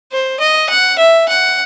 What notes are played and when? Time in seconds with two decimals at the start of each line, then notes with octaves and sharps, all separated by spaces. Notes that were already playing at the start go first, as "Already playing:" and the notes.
0.12 C5
0.40 D#5
0.69 F#5
0.99 E5
1.29 F#5